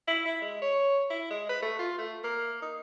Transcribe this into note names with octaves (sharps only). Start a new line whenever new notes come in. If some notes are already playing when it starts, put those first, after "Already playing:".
E4
E4
G#3
C#5
E4
G#3
B4
A3
F4
A3
A#3
D#4